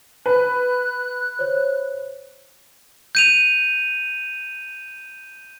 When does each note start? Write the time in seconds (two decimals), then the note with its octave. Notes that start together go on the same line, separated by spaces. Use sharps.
0.26 B4 F#6
1.39 C5 C#5
3.15 G6 D#7 F7